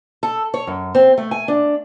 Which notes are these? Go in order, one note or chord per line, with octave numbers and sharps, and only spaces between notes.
A4
C#5
F#2
C4
A3
G#5
D4